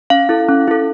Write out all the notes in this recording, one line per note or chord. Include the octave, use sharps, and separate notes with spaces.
C#4 F5
E4 A4
C#4
E4 A4